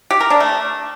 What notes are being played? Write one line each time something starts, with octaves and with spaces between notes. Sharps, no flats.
G4
A#4
D4
A3